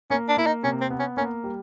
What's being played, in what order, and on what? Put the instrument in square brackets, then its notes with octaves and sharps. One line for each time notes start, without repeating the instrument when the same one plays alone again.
[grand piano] A#3 [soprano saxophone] C#4
[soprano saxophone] D4
[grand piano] A#3 [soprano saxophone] E4
[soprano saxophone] D#4
[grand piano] C3 [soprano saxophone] C#4
[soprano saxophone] C4
[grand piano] B3
[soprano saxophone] C#4
[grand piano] A#3 [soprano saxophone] C#4
[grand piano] G3